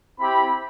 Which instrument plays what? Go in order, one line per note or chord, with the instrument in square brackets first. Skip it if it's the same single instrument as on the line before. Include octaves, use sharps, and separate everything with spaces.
[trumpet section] C4 E4 G4 B5